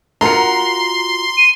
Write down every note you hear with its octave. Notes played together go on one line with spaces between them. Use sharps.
F4 F#4 A#4 A#5 C6 C#7
D#7